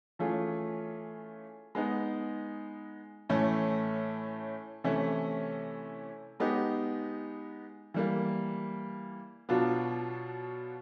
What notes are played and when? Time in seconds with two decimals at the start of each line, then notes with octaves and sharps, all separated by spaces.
0.19 E3 A3 C#4 F4 G#4
1.75 G#3 B3 D#4
3.29 A2 E3 A3 C#4
4.84 C3 E3 A3 C#4 E4
6.40 G#3 B3 D#4 G4
7.94 E3 G3 A#3
9.49 B2 F#3 B3 D4 F4